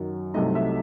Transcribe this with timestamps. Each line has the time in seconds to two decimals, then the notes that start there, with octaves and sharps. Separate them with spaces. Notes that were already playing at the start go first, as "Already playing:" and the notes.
Already playing: F#2 D#3 F#3
0.34 C2 C3 F#3 A3 D#4 D#5
0.55 E5